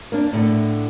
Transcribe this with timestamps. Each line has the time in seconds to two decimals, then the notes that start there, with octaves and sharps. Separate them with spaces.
0.12 A#3 D4
0.33 A2 D3